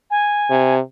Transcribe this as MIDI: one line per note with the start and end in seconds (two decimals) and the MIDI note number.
0.11 0.75 80
0.50 0.79 48